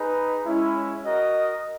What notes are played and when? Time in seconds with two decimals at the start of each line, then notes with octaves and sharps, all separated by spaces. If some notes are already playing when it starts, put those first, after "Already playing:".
Already playing: D#4 G#4 B4
0.46 G#3 C#4 E4
1.05 F#4 A#4 D#5